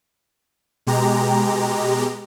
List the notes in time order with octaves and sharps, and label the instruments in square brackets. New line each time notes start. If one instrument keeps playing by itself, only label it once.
[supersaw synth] B2 G#3 G4 A#5